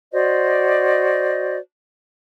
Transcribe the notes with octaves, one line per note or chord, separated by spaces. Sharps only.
F#4 C5 D5 D#5